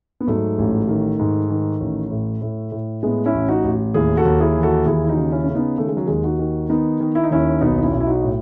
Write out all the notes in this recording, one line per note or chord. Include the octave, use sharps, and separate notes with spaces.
B3
G#2 F#3 A3
A1
D#3
G#2
D#3
A1
A2
A2
A2
A2 G#3 B3
C#4 E4
A1
D#4 F#4
A1
D#2 E4 G#4
F#4 A4
D#2
E4 G#4
E3
F#4 A4
D#2 E4 G#4
E4
D#4 F#4
C#3
C#4 E4
C#3 C#4
B3 D#4
D#3 A3
G#3
F#3
D#2 G#3
D#4 F#4
D#3
D#3 B3 D#4
D#3
E4
D#4
D#2 C#4 E4
B1 B3 D#4
D#4
C#4 E4
B1
E4
D#4 F#4
A2